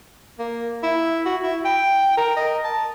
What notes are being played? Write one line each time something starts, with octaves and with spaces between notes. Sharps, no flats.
A#3
E4
F#4
E4
G5
A#4
D#5
A5